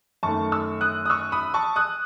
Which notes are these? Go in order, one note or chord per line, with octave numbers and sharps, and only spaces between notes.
F#2 D#3 A3 A5 C#6
C#6 E6
D#6 F#6
D#6
C#6 E6
B5 D#6
A5 C#6
D#6 F#6